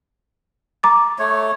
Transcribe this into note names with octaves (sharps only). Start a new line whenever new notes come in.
A#5 D6 A6
A3 C#5